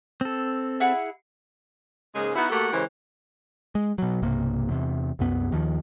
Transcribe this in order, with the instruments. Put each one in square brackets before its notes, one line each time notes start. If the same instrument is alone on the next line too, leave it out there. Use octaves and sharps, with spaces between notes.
[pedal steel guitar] C4 A4
[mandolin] E4 G#4 F#5
[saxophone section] G#2 C#3 G#3 A#3 G#4
B3 D#4 E4 F#4
A3 A#3 F#4 G4 A4 F#5
C#3 E3 G#3 G4 A#4 C5
[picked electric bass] G#3
B2 F#3
B1 G2 C3 A#3
E2 C3
C2 F#2 B3
D#2 D#3 F3